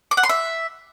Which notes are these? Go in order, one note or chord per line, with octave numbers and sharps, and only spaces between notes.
D6
F#5
C6
E5